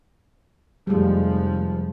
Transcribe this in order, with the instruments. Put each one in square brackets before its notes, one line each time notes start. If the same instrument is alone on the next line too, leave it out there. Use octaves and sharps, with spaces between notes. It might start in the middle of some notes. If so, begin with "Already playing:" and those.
[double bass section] F1 F3 [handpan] G3 G#3